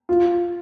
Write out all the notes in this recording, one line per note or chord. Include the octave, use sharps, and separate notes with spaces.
F4